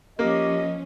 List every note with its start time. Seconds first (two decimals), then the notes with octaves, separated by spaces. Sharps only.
0.19 F3 A#3 C#4 G4 D#5